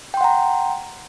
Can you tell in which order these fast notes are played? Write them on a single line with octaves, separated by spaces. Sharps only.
G5 C6 F#5 A#5